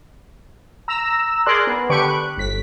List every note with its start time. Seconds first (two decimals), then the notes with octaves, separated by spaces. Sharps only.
0.88 A#5 E6
1.46 G#4 A#4 D5 C6 F#6
1.67 B3
1.89 D3 G4 B4 C#6 D7
2.08 F#6
2.37 G1 B6